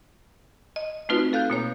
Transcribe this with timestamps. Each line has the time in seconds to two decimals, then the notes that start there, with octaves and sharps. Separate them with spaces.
0.76 D#5
1.09 A3 C4 D#4 F4 F#4 B4
1.33 A4 F5 F#6 G6
1.50 B2 A#3 C#5